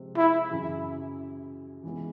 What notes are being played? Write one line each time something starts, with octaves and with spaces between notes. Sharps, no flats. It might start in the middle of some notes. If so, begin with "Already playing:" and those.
Already playing: C3 F3 G#3
E4
F#2 C#3 E3
E3 G#3 B3